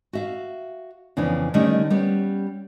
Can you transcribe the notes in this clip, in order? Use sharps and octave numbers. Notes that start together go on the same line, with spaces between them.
F#4 E5 F5
F2 C#3 E3 B3 D4
D3 D#3 G3 A3 C#4 D#4
G3 B3 C#4